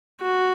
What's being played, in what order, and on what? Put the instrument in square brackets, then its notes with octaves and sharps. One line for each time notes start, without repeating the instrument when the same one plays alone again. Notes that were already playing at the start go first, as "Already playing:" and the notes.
[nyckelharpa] F#4